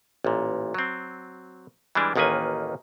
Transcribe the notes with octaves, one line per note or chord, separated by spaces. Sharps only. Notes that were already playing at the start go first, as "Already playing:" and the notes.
A1 A#2
F#3 C4
E3 G3 G#3 D4
A1 D#2 D#3 A#3 B4 G#5